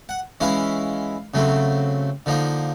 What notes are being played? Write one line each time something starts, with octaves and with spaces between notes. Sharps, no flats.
F#5
E3 G#3 C#4 E4 F5
C#3 F#3 A3 C4
D3 F3 A#3 D#4